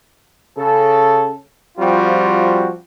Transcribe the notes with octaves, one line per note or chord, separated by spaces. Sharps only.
C#3 A4
F3 G3 C4 F4 F#4